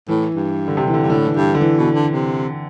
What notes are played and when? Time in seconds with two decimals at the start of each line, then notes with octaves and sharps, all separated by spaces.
0.08 A2 E3
0.35 G2
0.68 D3
0.77 C3
0.87 E3
0.94 D3
1.03 G2
1.10 A2 D3
1.27 E3
1.36 G2
1.55 D3
1.61 E3
1.78 B2
1.95 D3
2.12 C3